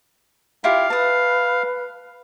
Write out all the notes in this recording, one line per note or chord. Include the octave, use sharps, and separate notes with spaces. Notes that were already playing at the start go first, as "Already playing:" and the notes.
E4 F4 G4 F5
B4 A5 D#6